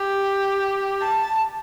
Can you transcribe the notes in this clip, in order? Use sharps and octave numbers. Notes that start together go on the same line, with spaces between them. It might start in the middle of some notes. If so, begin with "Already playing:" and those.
Already playing: G4
A5